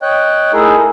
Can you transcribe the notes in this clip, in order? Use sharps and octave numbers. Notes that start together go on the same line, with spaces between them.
C#5 D#5 G5 F#6
A3 D#4 E4 G#4 A#4